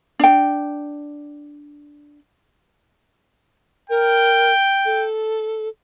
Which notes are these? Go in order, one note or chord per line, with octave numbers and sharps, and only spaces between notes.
D4 G5
A#4 G5
A4